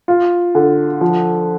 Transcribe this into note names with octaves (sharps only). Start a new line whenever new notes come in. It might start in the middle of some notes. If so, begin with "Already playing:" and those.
F4
D3
F3